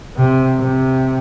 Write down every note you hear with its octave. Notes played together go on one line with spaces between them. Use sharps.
C3
C3